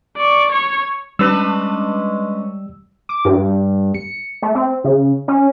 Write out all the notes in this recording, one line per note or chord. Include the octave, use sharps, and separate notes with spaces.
D5 C#6
C#5
G3 G#3 C#4 D4 B4 E6
D6
G2
C#7
A3
C4
C#3
C#4